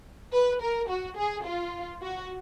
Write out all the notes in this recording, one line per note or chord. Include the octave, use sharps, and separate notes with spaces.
B4
A#4
F#4
G#4
F4
F#4